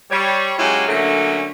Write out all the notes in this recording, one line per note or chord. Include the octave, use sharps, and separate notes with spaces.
G3 C#5
F#3 G#3 C#4 E4 F4 G4
D3 F#3 A3 A#3 C#4